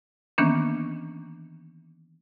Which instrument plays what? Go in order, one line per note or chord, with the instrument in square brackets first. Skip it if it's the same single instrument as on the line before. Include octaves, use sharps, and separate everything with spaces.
[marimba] D#3 E3 A#3 B3 C#4 D4